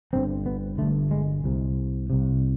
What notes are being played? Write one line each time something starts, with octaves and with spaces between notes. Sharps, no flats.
G1 G2 D3 C4
B3
G1 G2 D3 A3
G#3
C2 C3
C2 C3